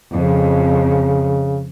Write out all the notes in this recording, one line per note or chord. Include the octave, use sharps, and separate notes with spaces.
F2 C#3